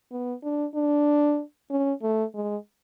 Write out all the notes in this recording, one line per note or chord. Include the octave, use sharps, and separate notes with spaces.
B3
D4
D4
C#4
A3
G#3